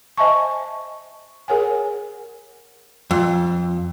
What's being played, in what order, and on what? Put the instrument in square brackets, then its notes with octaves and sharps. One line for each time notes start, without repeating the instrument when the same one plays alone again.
[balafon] C5 D#5 E5 G#5 A5 C#6
G#4 A#4 C#5 F#5 G#5
[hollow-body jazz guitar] F2